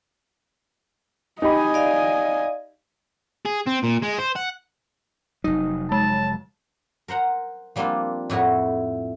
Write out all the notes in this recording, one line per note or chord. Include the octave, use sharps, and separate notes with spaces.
D#4 G4 D#5 G#5 B5
D5 F5
G#4
C4
A#2
G#3
C5
F#5
F1 F#3 D#4
G#3 A5
A#4 C5 F#5 A#5
F3 G3 A#3 C4 D4 F4
F2 A2 E4 F#4 A#5